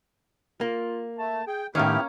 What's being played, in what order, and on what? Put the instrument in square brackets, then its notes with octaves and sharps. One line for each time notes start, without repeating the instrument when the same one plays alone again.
[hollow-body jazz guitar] A#3 [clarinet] F4
[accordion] A3 [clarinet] A5
[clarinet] G#4 [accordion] G5
[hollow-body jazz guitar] A2 D#3 [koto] A#3 C#4 [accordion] B3 E4 G4 [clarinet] F6